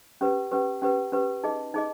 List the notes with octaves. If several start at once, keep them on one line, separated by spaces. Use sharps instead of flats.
C#4 G4 B4
C#4 G4 B4
C#4 G4 B4
C#4 G4 B4
D#4 G#4 D#5
D#4 G#4 D#5